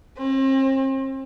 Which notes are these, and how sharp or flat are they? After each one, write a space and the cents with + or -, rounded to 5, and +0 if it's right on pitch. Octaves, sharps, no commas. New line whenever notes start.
C4 +40